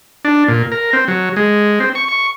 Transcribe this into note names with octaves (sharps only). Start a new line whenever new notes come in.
D4
A#2
A#4
C4
F#3
G#3
C4
C#6
C#6